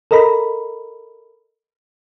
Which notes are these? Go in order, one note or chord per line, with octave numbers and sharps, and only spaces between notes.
A4 A#4 D#5 A#5 B5